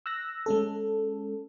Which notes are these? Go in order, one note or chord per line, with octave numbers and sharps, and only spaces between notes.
E6 F#6 A#6
G#3 C#4 A4